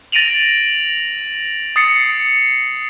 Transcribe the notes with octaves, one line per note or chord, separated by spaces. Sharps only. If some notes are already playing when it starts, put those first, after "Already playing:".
A6 A#6 D7 D#7 F7 F#7
D#6 A6 C7 C#7